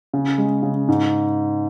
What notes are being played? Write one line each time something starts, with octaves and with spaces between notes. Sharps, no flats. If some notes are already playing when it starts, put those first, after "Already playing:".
C#3
G#3
C#3
G#2